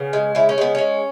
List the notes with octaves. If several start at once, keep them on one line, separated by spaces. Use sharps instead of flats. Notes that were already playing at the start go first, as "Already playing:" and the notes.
Already playing: C#3 B3
G#3
C#3 E4
C#4
G#3 B3
G#3 C#4